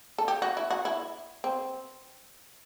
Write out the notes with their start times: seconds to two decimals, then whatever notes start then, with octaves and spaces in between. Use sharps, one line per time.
0.18 A4
0.28 G4
0.42 F#4
0.57 E4
0.70 F#4
0.85 E4
1.44 C4